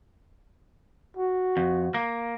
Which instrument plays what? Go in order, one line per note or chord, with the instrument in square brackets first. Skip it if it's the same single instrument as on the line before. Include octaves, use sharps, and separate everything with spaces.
[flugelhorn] F#4
[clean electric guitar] F2
A#3